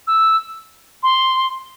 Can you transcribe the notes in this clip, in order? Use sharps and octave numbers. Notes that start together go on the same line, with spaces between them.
E6
C6